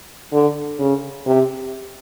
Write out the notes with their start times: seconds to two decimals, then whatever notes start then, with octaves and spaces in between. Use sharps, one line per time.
0.33 D3
0.79 C#3
1.26 C3